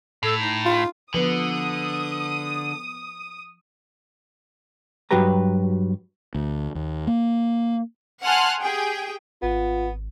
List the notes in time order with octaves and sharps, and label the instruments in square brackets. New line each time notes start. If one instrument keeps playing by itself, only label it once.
[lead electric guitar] A2 [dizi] A4
[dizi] D#4
[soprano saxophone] F4
[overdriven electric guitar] D3 [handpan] F3 [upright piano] B3 [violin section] D#6
[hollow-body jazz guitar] G2 F#3 F#4 G4 B4 A#5
[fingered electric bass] D2
D#2
A#3
[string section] F#5 G#5 A5 C6 F6 F#6
G4 G#4 G5
[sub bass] G#1 [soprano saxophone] B3 [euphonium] F4